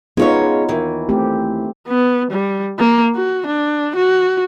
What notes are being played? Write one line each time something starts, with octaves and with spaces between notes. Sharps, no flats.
G#3 B3 C#4 D#4 F4 C#5
D#2 E3
A3 C4 G4
B3
G3
A#3
F#4
D4
F#4